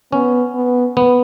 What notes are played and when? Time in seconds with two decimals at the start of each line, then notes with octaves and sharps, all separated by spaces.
0.12 B3 C#4
0.55 B3
0.97 B3